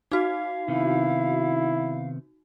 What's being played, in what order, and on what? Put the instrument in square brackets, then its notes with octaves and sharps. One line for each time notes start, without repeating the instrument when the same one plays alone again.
[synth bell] D#4 F#4 [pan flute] F5
[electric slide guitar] C3 D#3 B3 [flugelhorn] E4